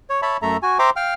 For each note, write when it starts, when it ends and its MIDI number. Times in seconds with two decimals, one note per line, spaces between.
0.10 0.21 73
0.22 0.37 73
0.22 0.37 76
0.22 0.37 81
0.22 0.37 83
0.42 0.57 42
0.42 0.57 57
0.42 0.57 69
0.42 0.57 76
0.42 0.57 82
0.63 0.78 66
0.63 0.78 80
0.79 0.90 72
0.79 0.90 76
0.79 0.90 79
0.79 0.90 82
0.79 0.90 84
0.79 0.90 86
0.96 1.14 77
0.96 1.14 79
0.96 1.14 89